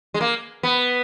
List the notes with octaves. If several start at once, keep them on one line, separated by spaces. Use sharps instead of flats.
G#3
A#3
B3